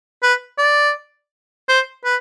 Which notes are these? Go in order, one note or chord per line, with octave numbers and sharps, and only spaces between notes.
B4
D5
C5
B4